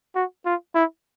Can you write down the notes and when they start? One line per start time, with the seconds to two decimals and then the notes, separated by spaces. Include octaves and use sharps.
0.15 F#4
0.45 F4
0.75 E4